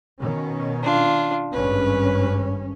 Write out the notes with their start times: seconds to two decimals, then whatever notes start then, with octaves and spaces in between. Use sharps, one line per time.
0.21 B2 D#3 C#4
0.83 D4 F4
1.53 G#1 G2 C#4 B4